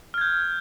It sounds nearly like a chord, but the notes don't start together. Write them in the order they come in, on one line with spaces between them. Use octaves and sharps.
F6 G#6 G6